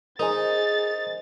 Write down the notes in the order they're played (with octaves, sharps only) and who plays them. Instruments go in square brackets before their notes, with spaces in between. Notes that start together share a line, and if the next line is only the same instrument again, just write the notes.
[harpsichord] D#4 [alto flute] G#4 [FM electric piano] A#4 C5 G#5 [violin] A6